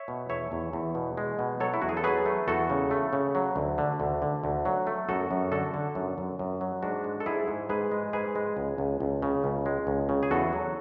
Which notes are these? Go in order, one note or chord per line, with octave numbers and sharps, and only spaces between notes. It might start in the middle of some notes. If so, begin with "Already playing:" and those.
Already playing: C#5 E5
B2
E2 C#5 E5
E2
E2
B2
G#3
B2
F#3 A4 C#5
E4
E2 F#4
G#4
A4
F#3 G#4 B4
A3
E2 F#4 A4
C#3
A3
C#3
F#3
D2
D3
D2
D3
D2
F#3
A3
F#2 F#4 A4
F#2
D3 F#4 A4
D3
F#2
F#2
F#2
F#3
G#2 D4 F#4
G#3
A4
G#2 E4 G#4
G#2
G#2 G#4 B4
G#3
G#2 G#4 B4
G#3
C#2
C#2
C#2
C#3
C#2
G#3
C#2
C#3
G#4
E2 F#4 A4
F#3